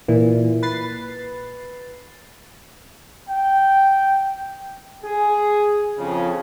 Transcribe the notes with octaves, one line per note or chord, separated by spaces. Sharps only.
A#2 E3
B4 A6 C7
G5
G#4
F2 C#3